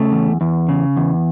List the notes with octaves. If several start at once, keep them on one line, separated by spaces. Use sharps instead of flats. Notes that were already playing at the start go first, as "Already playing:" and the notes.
Already playing: C#3 A3
E2
E2
C#3
E2